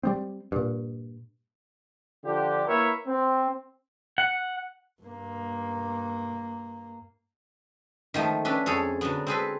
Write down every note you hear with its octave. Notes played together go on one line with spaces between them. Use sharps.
G3 B3 C4
G2 A#2
D3 F3 D4 F4 G4
A#3 E4 A#4 B4 C#5 E5
C4
F#5
G2 A#3
D#3 F3 A3
C#4 D4 A4 B4
F2 G#4 A4 C#5
D3 F#3 B3
C4 G#4 A4 B4